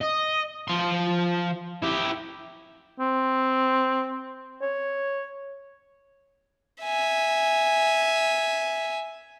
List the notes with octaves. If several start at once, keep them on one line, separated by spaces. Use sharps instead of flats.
D#5
F3 C6
E4 G4
C4
C#5
E5 G#5